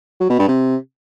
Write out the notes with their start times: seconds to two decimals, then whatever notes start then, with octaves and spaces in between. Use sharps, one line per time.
0.20 F#3
0.30 B2
0.39 G2
0.48 C3